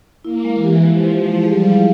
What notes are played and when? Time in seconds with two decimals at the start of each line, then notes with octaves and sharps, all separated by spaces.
0.24 A#3 E4
0.45 G#3
0.54 E3
0.63 G4
0.84 F3 G#3
1.05 E4
1.14 F3
1.24 G#3
1.43 G3 G#4
1.64 F5